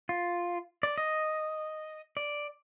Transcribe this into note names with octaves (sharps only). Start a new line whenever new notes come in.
F4
D5
D#5
D5